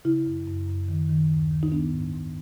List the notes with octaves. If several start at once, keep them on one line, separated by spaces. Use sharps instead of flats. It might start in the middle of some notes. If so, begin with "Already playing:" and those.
C#3 E4
F#2
F#2
F#2
D#3
D#3
D2
D#3
D#4
B3 D4
G#2
G#2